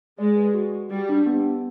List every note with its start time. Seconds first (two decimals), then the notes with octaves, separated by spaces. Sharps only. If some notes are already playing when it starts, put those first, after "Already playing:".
0.19 G#3 D5
0.36 B4
0.54 F#4
0.72 F#4
0.90 G3 G4
1.09 D4
1.26 B3
1.45 B3